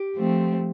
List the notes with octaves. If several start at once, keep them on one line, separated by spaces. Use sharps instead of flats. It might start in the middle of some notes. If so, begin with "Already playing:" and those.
Already playing: G4
F3 A3 C4